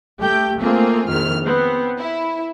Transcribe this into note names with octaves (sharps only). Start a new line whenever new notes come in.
A3 G4 G5 G6
A3 A#3 C4 F4 G#4
A#1 F2 D#3 F6
B3 C4
E4